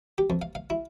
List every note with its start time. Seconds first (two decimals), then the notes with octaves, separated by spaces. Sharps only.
0.18 G4
0.30 F2
0.42 F5
0.55 F5
0.70 E4